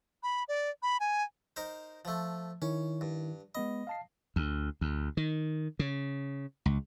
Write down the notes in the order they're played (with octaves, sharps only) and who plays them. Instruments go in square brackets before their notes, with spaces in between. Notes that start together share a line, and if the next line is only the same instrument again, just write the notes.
[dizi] B5
D5
B5
G#5
[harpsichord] D#4 A#4 C5
F3 A3
[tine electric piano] D#3 E4 [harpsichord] C#4
[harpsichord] G2
[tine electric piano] G#3 B3 B5 [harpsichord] D#5
[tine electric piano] F5 A5 C7
[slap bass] D2
D2
D#3
C#3
C#2